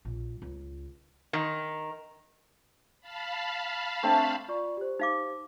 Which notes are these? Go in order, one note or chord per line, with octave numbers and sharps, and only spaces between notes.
A#1
C#2
D#3
F5 A5 B5
A3 C4 D4
F4 D5 C#6
G4 C5
D#4 F5 D6